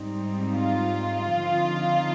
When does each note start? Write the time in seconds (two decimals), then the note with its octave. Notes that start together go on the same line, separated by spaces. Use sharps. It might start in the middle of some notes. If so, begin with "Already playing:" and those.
Already playing: G#2 G3 C4 D#4
0.55 F4
1.38 D3 F3 C4 D#4